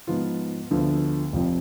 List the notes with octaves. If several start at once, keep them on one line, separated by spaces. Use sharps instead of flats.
G#2 F3 B3 F4
D2 D3 F3 B3
F1 F2 F3